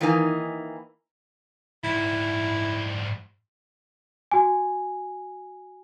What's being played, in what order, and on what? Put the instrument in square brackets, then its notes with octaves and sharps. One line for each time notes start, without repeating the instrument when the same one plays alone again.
[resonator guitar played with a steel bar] D#3 E3 A#3 D#4 G#5
[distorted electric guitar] G#2 G3 [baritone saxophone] E4
[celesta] F#4 G#5